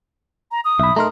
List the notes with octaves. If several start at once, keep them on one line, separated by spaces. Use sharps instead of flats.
A#5
D#6
B1 E5 B5
A3 D#4 A#4 A#5 C6